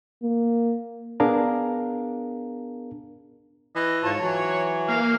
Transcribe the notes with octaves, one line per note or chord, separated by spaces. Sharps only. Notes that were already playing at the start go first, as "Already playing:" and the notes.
A#3
B3 D4 G#4 A#4 F5
E3 D#5
G#2 F4 C#5 A5
E3 F#3
A#3 F5